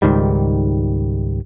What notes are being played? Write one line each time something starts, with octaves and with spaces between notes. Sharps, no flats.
C#2 G#2 D#3 G3